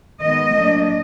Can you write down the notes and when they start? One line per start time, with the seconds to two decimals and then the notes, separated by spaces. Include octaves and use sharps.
0.23 D#3 G#3 B3 D#5
0.56 A2 F#3 A#3 D4